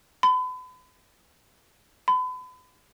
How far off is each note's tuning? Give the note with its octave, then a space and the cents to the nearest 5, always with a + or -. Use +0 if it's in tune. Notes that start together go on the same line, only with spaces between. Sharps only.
B5 +40
B5 +40